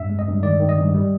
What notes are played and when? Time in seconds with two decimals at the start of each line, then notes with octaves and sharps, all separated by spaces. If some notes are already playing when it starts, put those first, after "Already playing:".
Already playing: G2 E5
0.09 G#3
0.19 D#5
0.27 G2
0.43 D#3 D5
0.60 D#3
0.69 D#5
0.77 G2
0.94 G3